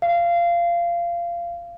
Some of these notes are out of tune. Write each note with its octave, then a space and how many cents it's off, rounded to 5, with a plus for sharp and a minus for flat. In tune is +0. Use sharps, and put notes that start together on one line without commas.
F5 -20